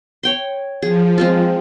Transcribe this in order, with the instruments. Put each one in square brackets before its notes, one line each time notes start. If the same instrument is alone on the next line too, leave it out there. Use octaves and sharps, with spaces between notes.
[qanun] C#5 G5 C6
[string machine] F3 [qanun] G#4
[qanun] G#3 C4 F4